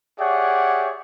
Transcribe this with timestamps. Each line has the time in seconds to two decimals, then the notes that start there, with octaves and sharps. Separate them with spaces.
0.20 G4 G#4 C#5 D5 E5 F#5